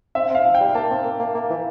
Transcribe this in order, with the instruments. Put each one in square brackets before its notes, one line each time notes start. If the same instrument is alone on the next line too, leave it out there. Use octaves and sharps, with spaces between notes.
[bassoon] C4 [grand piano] E5
[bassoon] C4
[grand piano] F5
[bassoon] F3
[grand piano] G5
[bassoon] G3
[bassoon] A#3 [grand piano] A5
[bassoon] C4
A#3
A#3
A#3
E3